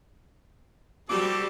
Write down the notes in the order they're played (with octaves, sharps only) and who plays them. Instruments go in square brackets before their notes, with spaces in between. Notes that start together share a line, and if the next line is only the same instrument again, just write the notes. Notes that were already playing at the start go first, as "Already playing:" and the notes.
[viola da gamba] G3 [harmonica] C4 G4 A4 [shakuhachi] F#4 [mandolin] D6